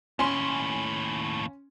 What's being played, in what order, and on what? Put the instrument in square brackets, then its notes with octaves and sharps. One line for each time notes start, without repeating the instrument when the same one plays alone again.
[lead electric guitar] D#2 A2 [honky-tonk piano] C#4 G#5 C6